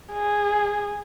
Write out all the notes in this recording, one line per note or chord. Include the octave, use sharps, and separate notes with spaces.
G#4